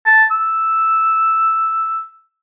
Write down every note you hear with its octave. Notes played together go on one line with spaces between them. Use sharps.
A5
E6